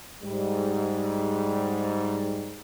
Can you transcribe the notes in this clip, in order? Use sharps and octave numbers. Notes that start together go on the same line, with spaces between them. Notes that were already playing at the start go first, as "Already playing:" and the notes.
G#2 G3